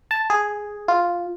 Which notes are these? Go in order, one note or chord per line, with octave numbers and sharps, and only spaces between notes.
A5
G#4
F4